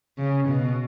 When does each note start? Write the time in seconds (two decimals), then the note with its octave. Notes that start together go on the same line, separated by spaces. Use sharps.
0.18 C#3
0.49 B2